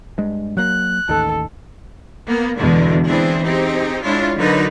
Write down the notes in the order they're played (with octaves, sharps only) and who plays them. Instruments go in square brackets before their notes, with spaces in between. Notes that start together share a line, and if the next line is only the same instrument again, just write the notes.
[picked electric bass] G2 G#3
[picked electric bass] F#3 A#3 [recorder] F#6
[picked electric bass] A1 D#2 D#3 [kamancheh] A4
[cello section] A#3 B3
E2 B2 D3 G#3
E3 C4 D4 E4 G#4
C4 D#4 G4 G#4
G#3 D4 E4 F4 C#5
D3 F#3 D#4 A#4 B4